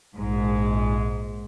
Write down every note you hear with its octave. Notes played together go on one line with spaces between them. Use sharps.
A#1 G#2 G#3